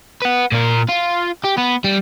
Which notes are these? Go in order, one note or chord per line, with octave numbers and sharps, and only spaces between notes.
B4 F#5
A#2 A#4
F4
G4
B3
G3